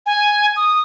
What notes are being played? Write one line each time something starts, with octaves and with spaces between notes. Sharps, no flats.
G#5
D#6